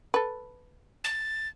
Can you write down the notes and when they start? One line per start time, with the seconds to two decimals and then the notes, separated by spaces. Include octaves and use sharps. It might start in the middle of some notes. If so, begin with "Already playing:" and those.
0.14 A4 B4
1.04 A6